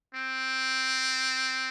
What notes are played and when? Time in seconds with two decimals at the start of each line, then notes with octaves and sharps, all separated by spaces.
0.15 C4